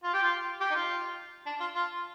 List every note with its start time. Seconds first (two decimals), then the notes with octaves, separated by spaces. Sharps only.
0.03 F4
0.13 G4
0.22 F4
0.61 G4
0.71 D#4
0.74 F4
1.46 D4
1.60 F4
1.75 F4